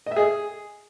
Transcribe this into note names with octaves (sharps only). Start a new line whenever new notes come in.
D#5
E5
G#4